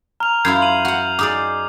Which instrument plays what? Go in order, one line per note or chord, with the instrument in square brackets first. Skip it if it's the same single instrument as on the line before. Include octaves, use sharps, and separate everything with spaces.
[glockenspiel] A#5 [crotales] F6 F7
[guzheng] F#2 E4 F4 [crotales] G6 G#6 C7
[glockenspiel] D#7 F#7
[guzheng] F#4 F#5 [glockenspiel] F7
[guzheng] D#4 G#4 D5 [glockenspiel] D6 D#6